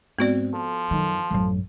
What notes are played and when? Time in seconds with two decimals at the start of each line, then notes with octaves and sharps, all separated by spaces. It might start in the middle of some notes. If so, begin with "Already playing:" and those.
0.19 G#2 B3 C4 F#4 D5
0.54 F3 A4
0.91 F#2 D#3
1.31 A1 F#2